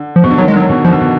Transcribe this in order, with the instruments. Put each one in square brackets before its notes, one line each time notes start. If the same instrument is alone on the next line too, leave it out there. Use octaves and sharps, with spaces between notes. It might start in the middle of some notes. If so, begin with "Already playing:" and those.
Already playing: [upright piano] D3
[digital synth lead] F3
[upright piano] B2
D3
[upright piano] D#3 [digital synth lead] F#3
[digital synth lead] G#3
[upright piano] D3 [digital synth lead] F#3
[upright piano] B2
[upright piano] D#3 [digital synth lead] F3
[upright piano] D3
B2